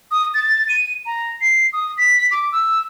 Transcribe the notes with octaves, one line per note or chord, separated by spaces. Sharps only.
D#6
A6
D#7
A#5
C7
D#6
B6
D6
E6